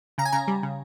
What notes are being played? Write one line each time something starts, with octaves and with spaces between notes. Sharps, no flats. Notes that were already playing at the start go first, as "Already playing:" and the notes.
C#3 A#5
G#5
C#3 A#5
G3
C#3